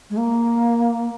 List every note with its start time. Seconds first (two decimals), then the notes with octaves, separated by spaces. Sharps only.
0.10 G#3
0.17 A#3